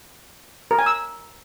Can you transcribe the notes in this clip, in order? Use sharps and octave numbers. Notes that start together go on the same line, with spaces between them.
A#4
G#5
E6